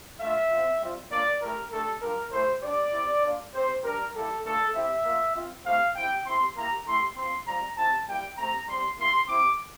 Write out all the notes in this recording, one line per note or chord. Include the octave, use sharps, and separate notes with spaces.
A3 D4 F4 E5
C4 F4
G3 C4 F4
A#3 D4 F4 D5
A3 E4 G4 A#4
A3 D4 G4 A4
G3 D4 F4 A#4
A3 E4 G4 C5
G3 D4 G4 D5
C4 E4 G4
A#3 D4 F4
C4 G4 C5
G3 D4 G4 A#4
G3 A#3 E4 G4 A4
A3 D4 F4 A4
C4 E4 G4 E5
A#3 F4
C4 F4
A3 C4 E4 G4 F5
C4 E4 G4 G5
C4 E4 G4 C6
A#3 E4 G4 A#5
A3 E4 G4 C6
C4 F4 C6
G3 C4 F4 A#5
C4 E4 G4 A5
G3 A#3 E4 G4 G5
A3 C4 G4 A#5
G3 C4 G4 C6
A#3 E4 G4 C6
C4 E4 G4 D6